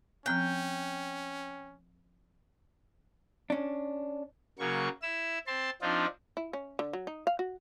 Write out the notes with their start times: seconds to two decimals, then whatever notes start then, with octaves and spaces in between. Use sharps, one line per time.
0.26 F3 C4 C#4 G5 F#6
3.50 C#4 D4
4.59 C#3 F#3 A#3 C#6
5.02 E4 E6
5.47 C4 A5 C6
5.82 F3 C4 D4 D#4 F4
6.37 E4
6.53 C#4
6.79 D3
6.93 F#3
7.07 D#4
7.27 F5
7.39 F#4